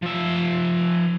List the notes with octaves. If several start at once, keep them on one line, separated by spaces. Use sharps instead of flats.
F3 E5